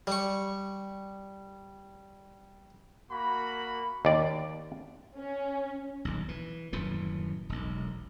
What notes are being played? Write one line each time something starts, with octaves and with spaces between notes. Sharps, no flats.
G3 C#6
A#3 F#4 B5
D#2 D5
C#4
D#1 B1
E3
D#1 F#2 A2 E3
E1 B1